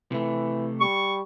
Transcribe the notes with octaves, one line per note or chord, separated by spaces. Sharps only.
C3 E3 A3
G3 C#6